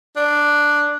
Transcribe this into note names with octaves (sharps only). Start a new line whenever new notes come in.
D4